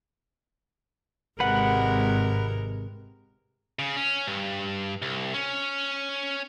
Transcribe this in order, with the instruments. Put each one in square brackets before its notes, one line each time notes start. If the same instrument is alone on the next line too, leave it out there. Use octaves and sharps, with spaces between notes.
[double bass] G#1 [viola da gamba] C3 G#3 A#4 [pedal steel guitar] B4 F#5
[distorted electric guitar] C#3
C#4
G2
C2
C#4